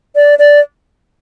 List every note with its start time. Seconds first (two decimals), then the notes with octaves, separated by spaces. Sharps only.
0.15 D5
0.39 D5